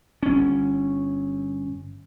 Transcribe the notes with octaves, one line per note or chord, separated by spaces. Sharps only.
G1 C#4